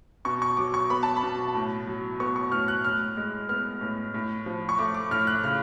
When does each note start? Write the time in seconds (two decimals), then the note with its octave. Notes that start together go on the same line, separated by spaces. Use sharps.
0.25 B2 C#6
0.42 C#6
0.57 F#3 D6
0.74 C#6
0.90 B3 B5
1.03 A5
1.16 B5
1.23 B2
1.54 A2
1.87 F#3
2.20 B3 C#6
2.36 C#6
2.52 A2 F6
2.68 F#6
2.84 A2 F6
3.17 G#3
3.49 B3 F6
3.81 A2
4.14 A2
4.46 F3
4.69 C#6
4.79 A3 D6
4.94 D6
5.11 A2 F6
5.27 F#6
5.44 C#3 F6